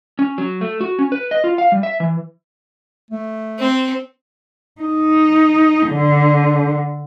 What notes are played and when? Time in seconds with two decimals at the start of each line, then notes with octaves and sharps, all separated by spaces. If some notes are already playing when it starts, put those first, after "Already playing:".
0.19 C#4
0.38 F#3
0.61 A3
0.81 F#4
0.99 C#4
1.12 B4
1.31 D#5
1.44 F4
1.58 F5
1.72 G3
1.83 E5
2.00 E3
3.11 A3
3.59 C4
4.82 D#4
5.88 D3